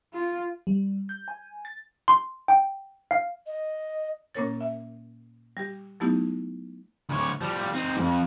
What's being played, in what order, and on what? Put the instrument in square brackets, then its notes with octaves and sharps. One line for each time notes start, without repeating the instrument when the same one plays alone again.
[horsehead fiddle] F4
[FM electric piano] G3
G6
G#5
A6
[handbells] C6
G5
F5
[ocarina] D#5
[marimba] A#2 A#3 C#4 A#4 C#5 A6
E5
G3 G4
F#3 A3 B3 D#4 E4 G4
[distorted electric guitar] D2 C#5
F3 G3
C4 D#4
F2 G#2